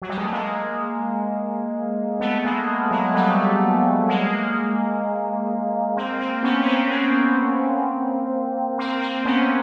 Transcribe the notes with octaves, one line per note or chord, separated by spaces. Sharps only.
F#3
G3
G#3
A3
G#3 A#3
A3 B3
G#3 A#3
F#3 G#3
G3 A3
G#3 A#3
A#3 C4
A#3 C4
B3 C#4
C4
B3 C#4
A#3 C4
A#3 C4
A#3 C4
B3 C#4